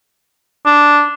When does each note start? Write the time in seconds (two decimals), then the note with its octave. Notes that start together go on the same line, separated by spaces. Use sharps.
0.66 D4